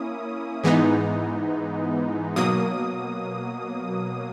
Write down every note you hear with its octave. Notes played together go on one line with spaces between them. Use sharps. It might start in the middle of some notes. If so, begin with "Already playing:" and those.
Already playing: A#3 C#4 E4 D#6
G#2 E3 G#3 B3 D#4
B2 F#3 A#3 D#6